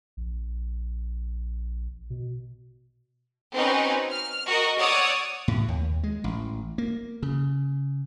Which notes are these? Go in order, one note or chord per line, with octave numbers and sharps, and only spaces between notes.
A#1
B2
C4 C#4 D#4 F#4 B4
F6
F#4 A#4 D#5
C#5 D5 F#5 D#6 E6
A2
D#2
G#3
A1
A#3
C#3